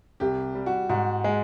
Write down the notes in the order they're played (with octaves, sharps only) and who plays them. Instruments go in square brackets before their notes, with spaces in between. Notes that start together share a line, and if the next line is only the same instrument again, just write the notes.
[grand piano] C2 [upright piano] G4
[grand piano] G3
[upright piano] F#4
[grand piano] G#2 [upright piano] F#4
[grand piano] G#3